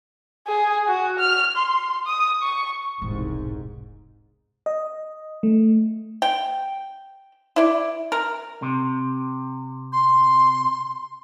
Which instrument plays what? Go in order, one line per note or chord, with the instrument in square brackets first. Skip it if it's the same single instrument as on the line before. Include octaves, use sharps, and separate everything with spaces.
[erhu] G#4
F#4
F6
C6
D#6
C#6
[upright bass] E1 [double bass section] C2 G#2
[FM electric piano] D#5
A3
[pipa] G5
E4 D5
A#4
[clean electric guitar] C3
[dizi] C6